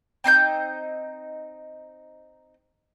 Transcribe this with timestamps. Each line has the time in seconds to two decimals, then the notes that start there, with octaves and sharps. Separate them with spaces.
0.24 C4 D#4 C6 G6